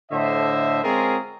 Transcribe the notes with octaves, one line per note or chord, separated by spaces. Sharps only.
A2 D3 C5 D#5 E5
G#3 C4 C#4 F4 G#4 A#4